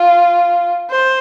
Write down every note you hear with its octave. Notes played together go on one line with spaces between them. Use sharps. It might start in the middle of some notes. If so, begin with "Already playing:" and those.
Already playing: F4
C5